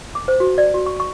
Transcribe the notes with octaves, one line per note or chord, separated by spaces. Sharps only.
D6
C5
F#4
D5
F#4
C#6
C#6